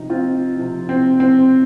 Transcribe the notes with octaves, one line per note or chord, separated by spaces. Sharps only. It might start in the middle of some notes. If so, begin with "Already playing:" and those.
Already playing: C3 F3 D#4
C4 F4
C3 F3
C4
C4